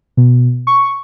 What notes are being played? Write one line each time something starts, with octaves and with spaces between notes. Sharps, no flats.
B2
C#6